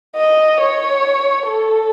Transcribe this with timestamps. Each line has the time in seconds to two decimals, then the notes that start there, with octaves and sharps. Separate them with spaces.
0.16 D#5
0.60 C#5
1.47 A4